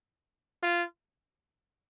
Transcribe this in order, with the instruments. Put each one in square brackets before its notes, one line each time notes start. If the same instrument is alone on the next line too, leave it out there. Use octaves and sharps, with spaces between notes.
[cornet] F4